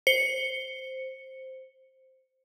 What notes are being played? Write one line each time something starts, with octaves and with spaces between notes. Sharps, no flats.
C5 C#7